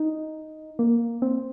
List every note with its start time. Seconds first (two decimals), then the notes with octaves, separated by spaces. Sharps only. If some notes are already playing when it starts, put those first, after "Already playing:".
Already playing: D#4
0.79 A#3
1.22 C4